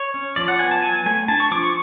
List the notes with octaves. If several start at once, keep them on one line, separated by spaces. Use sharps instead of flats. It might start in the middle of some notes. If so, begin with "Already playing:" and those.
Already playing: C#5
C#4
F3 D5
F#5
B3 G#5
A5
F#3 G#5
A3 G#5
D4 A5
C#6
F3 D6
C#6